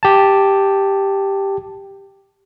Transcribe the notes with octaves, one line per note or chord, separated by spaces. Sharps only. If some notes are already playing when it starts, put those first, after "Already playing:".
G4 A5